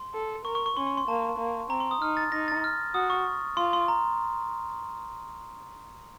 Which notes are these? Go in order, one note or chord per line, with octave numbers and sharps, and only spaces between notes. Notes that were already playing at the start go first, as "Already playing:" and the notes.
Already playing: C6
A4
A#4 C#6
C#6
C#6
C#4 C6
C6
C6
A#3 A5
A#3
C4 A#5
C6
D#6
D#4 F6
A6
D#4 A#6
A6
F6
F#4 D#6
C#6
F4 C6
C6
A#5